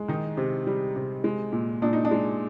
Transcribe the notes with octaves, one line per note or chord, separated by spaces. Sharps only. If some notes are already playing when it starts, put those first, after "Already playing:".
Already playing: G#3
D#3 D#4
C3
G3
C3
G#3
A#2
A#2 D4
D#4
D4
G#3